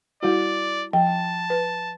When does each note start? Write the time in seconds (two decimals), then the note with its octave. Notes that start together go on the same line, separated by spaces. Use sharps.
0.23 G3 E4 F#4 D5
0.93 F3 G5 A5
1.50 B4